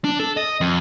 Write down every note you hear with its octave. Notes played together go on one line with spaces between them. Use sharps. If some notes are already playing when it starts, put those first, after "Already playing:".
D4
A4
D#5
F2